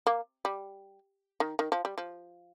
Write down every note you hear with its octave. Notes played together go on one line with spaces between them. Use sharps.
A#3
G3
D#3
D#3
F3
G3
F3